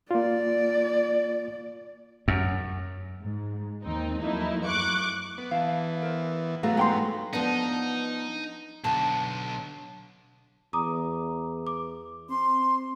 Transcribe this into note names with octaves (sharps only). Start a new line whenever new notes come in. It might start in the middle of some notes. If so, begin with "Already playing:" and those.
A#3 F4 D5
F#2
G#2
D#2 C4 D#4
F3 F#3 A3 A#3 D#4 E4
F#2 C#6 D6 F#6
B3
E3 B3 F5 A5
A#4 C5
F#3 A3 B3 F5 A#5
G#2 G5 C6
F3 B3 D4 D#4
B1 D3 A5
E2 A#5 D6 D#6
D6
C4 C6